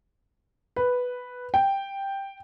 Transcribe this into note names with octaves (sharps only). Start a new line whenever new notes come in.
B4
G5